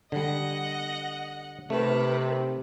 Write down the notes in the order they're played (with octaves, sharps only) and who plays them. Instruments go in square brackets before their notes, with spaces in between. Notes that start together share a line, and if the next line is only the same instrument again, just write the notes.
[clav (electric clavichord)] D3 G3 [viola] D#5 F#5
[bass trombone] C3 [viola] D#3 B4 [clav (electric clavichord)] A3